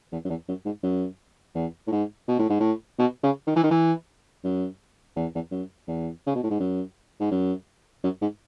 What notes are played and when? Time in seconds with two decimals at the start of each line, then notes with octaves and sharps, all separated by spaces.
0.12 E2
0.25 F#2
0.29 E2
0.48 F#2
0.65 G#2
0.83 F#2
1.55 E2
1.87 A2
1.92 G#2
2.28 B2
2.39 A2
2.49 G#2
2.60 A2
2.99 B2
3.23 C#3
3.47 D#3
3.56 E3
3.63 D#3
3.71 E3
4.44 F#2
5.16 E2
5.35 E2
5.51 F#2
5.88 E2
6.27 C#3
6.35 B2
6.43 A2
6.50 G#2
6.60 F#2
7.20 G#2
7.31 F#2
8.04 F#2
8.21 G#2